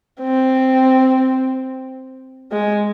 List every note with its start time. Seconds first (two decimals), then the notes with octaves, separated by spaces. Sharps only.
0.21 C4
2.52 G#3